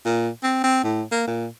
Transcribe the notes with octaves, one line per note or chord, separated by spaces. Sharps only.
A#2
C4
C4
A2
A#3
A#2